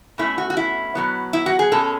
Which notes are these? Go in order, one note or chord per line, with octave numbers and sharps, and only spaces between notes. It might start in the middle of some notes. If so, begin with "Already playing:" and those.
B2 A3 C#4 E4
F#4
F#4
E4
B2 F#3 B3
E4
F#4
G#4
B2 G#3 C#4 A4